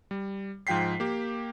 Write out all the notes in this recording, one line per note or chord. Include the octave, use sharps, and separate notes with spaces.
G3
G#2 F3 F4 G5 B6 C7
A#3 G4